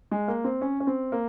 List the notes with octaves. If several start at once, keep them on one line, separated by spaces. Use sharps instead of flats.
G#3
A#3
C4
C#4
C#4
C4
A#3